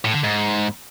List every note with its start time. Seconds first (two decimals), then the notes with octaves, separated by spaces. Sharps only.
0.05 A2
0.14 D3
0.24 G#2